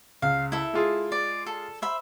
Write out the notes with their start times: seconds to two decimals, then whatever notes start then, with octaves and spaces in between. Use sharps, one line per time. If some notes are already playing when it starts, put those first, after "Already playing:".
0.22 C#2 F5
0.52 E4 A4 E5
0.73 G#3 F4 G#4
1.12 D5
1.46 A4
1.82 C5 E5 B5